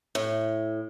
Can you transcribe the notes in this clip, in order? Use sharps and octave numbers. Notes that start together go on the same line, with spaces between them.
A2